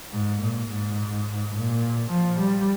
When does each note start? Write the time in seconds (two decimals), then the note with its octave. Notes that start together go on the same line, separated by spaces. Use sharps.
0.13 G#2
0.41 A#2
0.69 G#2
1.55 A#2
2.10 F3
2.39 G3